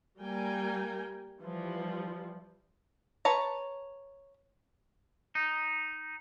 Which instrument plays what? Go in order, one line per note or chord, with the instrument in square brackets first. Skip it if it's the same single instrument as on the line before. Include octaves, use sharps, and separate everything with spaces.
[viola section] G3 A#3 A#4 G5 G#5
E3 F3 G3
[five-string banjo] B4 C#5 A5 A#5
[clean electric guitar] D#4